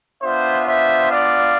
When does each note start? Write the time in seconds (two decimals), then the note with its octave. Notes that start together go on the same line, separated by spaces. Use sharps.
0.22 B3 D4 F4 C5 E5
0.67 C5 E5
1.11 D5 F5